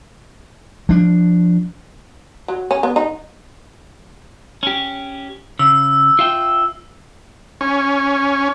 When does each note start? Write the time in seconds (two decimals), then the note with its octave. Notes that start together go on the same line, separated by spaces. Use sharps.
0.89 F3 D4
2.48 F#3
2.71 C#4
2.83 B3
2.96 D#4
4.63 C#4 G4
5.59 C#3 E6
6.19 F4 E5 G5
7.61 C#4